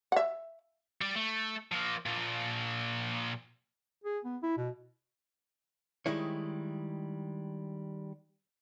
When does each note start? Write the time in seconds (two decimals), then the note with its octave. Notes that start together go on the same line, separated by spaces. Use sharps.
0.12 E5 F#5
1.01 G3 D5
1.15 A3
1.72 F3 A#3
2.06 A#2 F3
4.04 G#4
4.25 B3
4.43 E4
4.57 B2
6.06 D#3 G3 G#3 E4 C#5